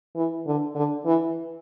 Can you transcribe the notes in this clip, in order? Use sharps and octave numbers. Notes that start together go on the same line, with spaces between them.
E3
D3
D3
E3